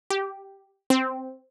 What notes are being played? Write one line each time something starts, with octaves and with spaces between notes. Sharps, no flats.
G4
C4